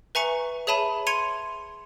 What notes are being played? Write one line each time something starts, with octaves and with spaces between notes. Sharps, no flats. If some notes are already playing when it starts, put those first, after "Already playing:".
B4 E5 G#5 A#5 C#6 C#7
G#4 C#5 E5 A5 B5 D#7
C6 G#6 C#7 D#7 F7